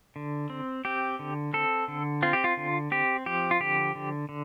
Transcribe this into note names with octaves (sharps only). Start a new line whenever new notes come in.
D3
C4
C4 G4
D3
C4 A4
D3
C4 F4
G4
F4
D3
C4 G4
F3 G4
F4
D3 G4
D3
D3